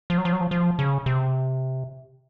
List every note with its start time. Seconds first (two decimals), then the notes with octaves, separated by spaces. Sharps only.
0.10 F3
0.18 F#3
0.25 F3
0.33 F#3
0.41 F3
0.51 F3
0.79 C#3
1.06 C3